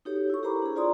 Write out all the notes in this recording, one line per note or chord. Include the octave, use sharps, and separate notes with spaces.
D#4 F#4 G4 A4 C#5
E4 C#6
G4 A#4 C5 A#5 B5 D6
D4 G#4
F4 C5 D5 A#5 C6 D#6